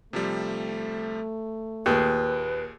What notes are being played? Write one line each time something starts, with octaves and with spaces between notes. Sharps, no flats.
C3 F3 G3 A3
D#2 A#2 G#4 B4